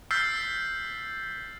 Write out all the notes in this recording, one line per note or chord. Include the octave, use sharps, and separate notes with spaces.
E6 F6 G6 A6 B6 C7